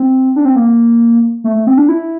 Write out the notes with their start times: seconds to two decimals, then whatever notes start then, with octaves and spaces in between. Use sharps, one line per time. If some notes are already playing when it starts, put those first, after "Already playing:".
Already playing: C4
0.36 D4
0.45 C4
0.56 A#3
1.44 A3
1.56 A3
1.67 C4
1.77 D4
1.89 E4